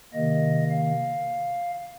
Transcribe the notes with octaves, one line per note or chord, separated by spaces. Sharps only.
C3 D#3 A#3 D#5
F5